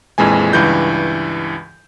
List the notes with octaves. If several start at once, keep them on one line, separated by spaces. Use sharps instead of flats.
A#1 F2 E3 G#3 G#5
C#2 G2 E3 G6